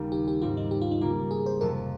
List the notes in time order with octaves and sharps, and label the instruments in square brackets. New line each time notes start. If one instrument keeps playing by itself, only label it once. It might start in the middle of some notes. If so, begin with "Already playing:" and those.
Already playing: [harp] D#2 C#3 G3
[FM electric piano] G4
G4
[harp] G#2 G3 C4 [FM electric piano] F4
[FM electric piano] D#4
G4
F4
D#4
[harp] C#3 G3 A#3 [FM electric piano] F4
[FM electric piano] G#4
C5
[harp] F2 C3 F3 [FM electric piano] A#4